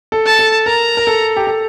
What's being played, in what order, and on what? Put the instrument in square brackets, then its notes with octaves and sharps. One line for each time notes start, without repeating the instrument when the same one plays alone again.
[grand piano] A4
[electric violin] A5
[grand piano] A4
[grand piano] A#4 [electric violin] A#5
[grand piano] A#4
A4
G4
A4